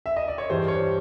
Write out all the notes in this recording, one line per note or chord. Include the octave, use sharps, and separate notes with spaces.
E5
D#5
D5
C#5
G2 E3 G3 C5
C#5